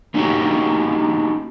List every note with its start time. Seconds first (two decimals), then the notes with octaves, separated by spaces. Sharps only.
0.14 A#3 C#4 D#4 E4 F#4 G4